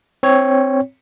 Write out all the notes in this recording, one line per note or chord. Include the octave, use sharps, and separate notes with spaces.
C4 C#5